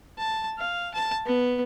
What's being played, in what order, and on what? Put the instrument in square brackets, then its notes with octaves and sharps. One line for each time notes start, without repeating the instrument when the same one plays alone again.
[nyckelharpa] A5
F5
A5
B3